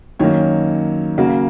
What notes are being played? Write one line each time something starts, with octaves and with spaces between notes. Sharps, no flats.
F#2 D#3 F#3 A#3 C#5
C#3 F#3 A#3 F#4